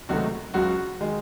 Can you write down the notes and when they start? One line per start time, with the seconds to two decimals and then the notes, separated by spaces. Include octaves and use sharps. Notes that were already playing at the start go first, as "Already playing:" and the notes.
0.09 C#2 C3 D#3 F#3 A3 F#4
0.54 C#2 C#3 F#3 F#4
1.00 D#3 G#3